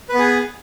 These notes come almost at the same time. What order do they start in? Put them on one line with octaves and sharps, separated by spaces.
B4 B3 G#4